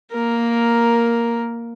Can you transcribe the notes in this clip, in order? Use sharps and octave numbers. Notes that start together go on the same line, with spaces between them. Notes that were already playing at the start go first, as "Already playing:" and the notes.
A#3 A#4